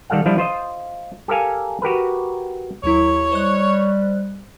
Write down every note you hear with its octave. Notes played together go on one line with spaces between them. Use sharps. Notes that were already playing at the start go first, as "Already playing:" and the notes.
D#3 G3 A4 F5 F#5
F3 G3 D4 E4
F4 C5 D#5
G4 A4 A#4 F5 G#5
F#4 G4 A#4 B4
D#2 F#3 E4 C#5
G3 C5 D#5 F#6